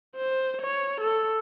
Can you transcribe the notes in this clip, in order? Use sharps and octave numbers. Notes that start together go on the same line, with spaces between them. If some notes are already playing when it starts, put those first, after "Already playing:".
C5
C#5
A4